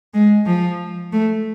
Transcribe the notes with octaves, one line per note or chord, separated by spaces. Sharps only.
G#3
F3
A3